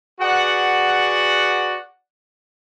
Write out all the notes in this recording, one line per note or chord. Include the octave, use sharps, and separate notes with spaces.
F#4 G#4 B4 D5 F#5